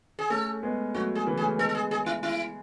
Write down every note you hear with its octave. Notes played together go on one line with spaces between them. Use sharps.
G#4
A3 C#4 A4
G#3 B3
F#3 A3 F#4
G#4
C#3 E3
G#4
A3 C#4
G#3 B3 A4
A4
G#4
G#4
E4
E4